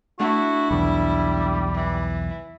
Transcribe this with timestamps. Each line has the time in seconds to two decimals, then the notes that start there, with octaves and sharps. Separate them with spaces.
0.20 A3 D4 E4 F#4 F#5
0.71 B1 E2 G3
1.74 E3